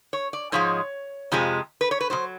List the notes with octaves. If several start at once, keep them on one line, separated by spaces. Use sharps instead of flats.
C#5
D5
G#2 F3 G#3 C#5
F2 C3 F3 G#3
B4
C#5
B4
B2 F#3 C5